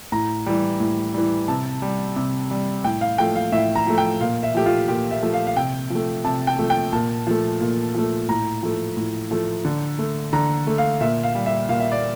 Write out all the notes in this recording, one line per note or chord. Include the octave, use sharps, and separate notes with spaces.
A2 A#5
E3 G3
A2
E3 G3
C3 A5
G3
C3
G3
A2 G5
F5
F3 A3 G5
F5
A2 E5
A#5
F3 A3
G5
A#2 F5
E5
F3 A3 G4
F4
A#2 G4
E5
F3 A3
F5
F5
C3 G5
F3 A3
C3 A5
G5
F3 A3
G5
A#2 A5
F3 A3
A#2
F3 A3
A2 A#5
F3 A3
A2
F3 A3
D3
A3
D3 A#5
A3
F5
A#2 E5
F5
G3
E5
A#2 F5
E5
D5